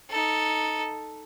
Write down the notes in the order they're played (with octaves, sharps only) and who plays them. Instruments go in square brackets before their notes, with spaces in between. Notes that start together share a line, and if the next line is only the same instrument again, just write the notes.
[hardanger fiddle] D#4 A4